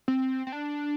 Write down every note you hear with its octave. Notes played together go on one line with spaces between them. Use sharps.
C4
C4
D4